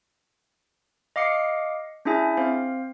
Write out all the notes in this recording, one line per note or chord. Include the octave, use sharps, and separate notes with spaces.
D#5 F5 D6 C7 C#7
C#4 D4 E4 G#4 E5 G#5
C4 C5 F5